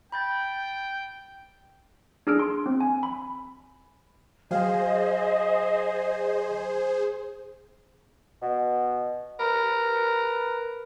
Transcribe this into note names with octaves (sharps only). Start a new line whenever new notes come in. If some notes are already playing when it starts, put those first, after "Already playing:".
G5 B5 G6 A6
D4 G#4 E6 F6 D7
C6
C4
G#5
B5
F#3 G#4 C5 D#5 F5 G5
B2
A#4 B4